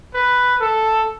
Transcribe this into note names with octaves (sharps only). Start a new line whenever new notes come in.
B4
A4